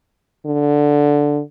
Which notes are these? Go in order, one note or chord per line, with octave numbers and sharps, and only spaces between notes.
D3